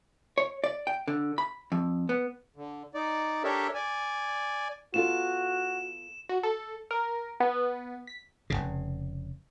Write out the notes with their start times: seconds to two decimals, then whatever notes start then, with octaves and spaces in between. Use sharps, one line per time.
0.38 C#5
0.64 D5
0.87 G5
1.08 D3
1.38 B5
1.72 F2
2.09 B3
2.56 D3
2.95 D#4 D5
3.44 D4 G4 A4 A#4 C#5 E5
3.74 D5 G#5
4.94 B3 F4 F#4 A4 E7
6.29 F#4
6.43 A4
6.91 A#4
7.40 B3
8.07 B6
8.50 F1 A#1 C#3